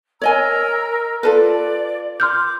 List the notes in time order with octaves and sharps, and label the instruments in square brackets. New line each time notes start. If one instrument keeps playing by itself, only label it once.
[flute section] A#4 A#5 E6 [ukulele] C#5 D#5 G#5
[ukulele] F4 A4 B4 [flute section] D5
[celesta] C6 F6 G6 [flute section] D6